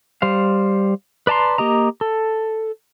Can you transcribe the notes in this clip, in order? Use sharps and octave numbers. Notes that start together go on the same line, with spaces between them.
G3 C5 F5
B4 D5 A5 A#5 C6
A#3 G4 D#5 A#5
A4